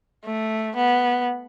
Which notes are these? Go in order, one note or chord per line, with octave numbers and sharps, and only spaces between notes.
A3
B3